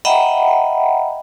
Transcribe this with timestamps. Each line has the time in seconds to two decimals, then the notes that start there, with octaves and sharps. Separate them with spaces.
0.05 D#5 E5 F#5 G5 A#5 B5